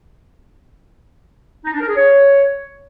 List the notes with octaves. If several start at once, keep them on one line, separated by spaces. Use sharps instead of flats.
D#4
D4
A#4
G#4
C#5